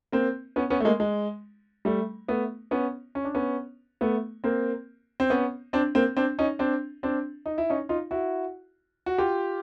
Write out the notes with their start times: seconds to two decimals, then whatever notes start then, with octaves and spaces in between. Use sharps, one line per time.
0.12 A#3 C4
0.56 B3 C#4
0.70 B3 C#4
0.80 A3
0.85 G#3 A#3
1.00 G#3
1.85 G3 A3
2.28 A3 B3
2.71 B3 C#4
3.15 C#4
3.24 D4
3.35 B3 C#4
4.01 A3 B3
4.44 A#3 C4
5.20 C4
5.30 B3 C#4
5.73 C4 D4
5.95 A#3 C4
6.17 C4 D4
6.39 C#4 D#4
6.59 C4 D4
7.03 C4 D4
7.46 D#4
7.58 E4
7.70 C#4 D#4
7.89 D#4 F4
8.11 E4 F#4
9.06 F#4
9.18 F4 G4